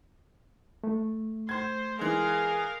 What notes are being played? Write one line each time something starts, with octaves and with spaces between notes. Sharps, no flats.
A3
C5 C6 G#6
E3 G#3 G#4 A#4 F5